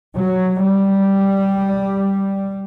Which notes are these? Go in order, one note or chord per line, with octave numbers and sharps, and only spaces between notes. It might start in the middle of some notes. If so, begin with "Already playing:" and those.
F#3
G3